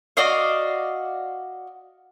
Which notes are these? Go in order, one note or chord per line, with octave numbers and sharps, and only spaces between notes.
F#4 D5 D#5 F5